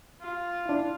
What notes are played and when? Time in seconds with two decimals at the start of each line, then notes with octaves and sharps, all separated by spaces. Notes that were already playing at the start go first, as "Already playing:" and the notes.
0.22 F4
0.65 D4 E4